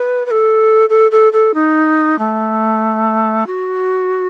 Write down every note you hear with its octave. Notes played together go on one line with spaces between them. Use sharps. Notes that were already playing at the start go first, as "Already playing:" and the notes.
Already playing: B4
B4
A4
A4
A4
A4
D#4
A3
F#4